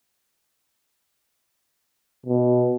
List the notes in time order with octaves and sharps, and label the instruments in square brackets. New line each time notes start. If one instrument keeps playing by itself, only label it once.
[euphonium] B2